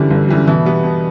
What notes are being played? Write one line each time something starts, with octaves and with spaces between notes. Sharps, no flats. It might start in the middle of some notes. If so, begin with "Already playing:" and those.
Already playing: G1 F#2 D3 E3 G3
G1
F#2 E3 G3
B2 E3
G3 B3
B2